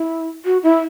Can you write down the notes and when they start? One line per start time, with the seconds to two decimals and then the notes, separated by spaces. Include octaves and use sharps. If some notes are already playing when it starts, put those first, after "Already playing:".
Already playing: E4
0.45 F#4
0.63 E4